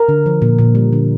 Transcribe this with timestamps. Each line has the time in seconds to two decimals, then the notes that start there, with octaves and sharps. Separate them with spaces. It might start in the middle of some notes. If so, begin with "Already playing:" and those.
Already playing: A#4
0.09 D3
0.26 F3
0.42 A#2
0.59 A#2
0.75 G3
0.93 D3